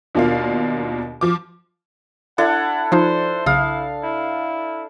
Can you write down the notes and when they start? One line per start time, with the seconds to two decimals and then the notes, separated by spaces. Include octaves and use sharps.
0.15 D#2 B2 D4 F4 A#4 F5
1.21 F3 D6
2.38 D4 E4 A4 F#5
2.92 F3 D#4 F4 C5
3.46 B1 C#3 E4 F5 D#6
4.04 E4